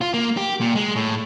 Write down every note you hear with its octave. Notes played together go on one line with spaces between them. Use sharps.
F4
A#3
G4
A#2
G#3
A2